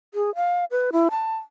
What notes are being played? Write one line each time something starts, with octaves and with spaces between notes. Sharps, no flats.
G#4
F5
B4
E4
A5